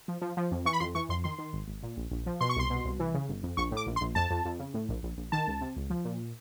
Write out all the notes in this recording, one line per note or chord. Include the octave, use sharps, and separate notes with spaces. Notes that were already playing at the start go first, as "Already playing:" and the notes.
F3
F3
F3
F2
E3 C#6
B5
F2 C6
E3 C#6
F2 C6
D#3 C6
D#3
G#1
G#1
A#2
A#1
A#1
F3
B2 C6
C#6
C2 C6
B2
C2
E3
C#3
G1
F2
A#1 C#6
A2
D6
A#1
C6
A#1
F2 A5
F2
F2
C#3
A2
A#1
A#1
A#1
D#3 A5
C#2
C3
C#2
F3
A#2